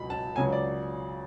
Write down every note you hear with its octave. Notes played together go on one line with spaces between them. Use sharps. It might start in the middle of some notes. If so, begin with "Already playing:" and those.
Already playing: C#2 B2 F#3 B5
A5
C#2 C#3 F#3 G#5
D5